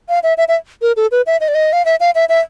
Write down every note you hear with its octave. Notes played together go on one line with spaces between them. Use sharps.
F5
E5
E5
E5
A#4
A4
B4
E5
D#5
D5
D#5
F5
E5
F5
E5
E5